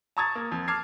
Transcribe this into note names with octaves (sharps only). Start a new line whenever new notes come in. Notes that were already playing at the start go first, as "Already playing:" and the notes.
A5 A#5 C#6 D#6 G#6 A6
A#3
F2
A5 D6 F6 G#6 C7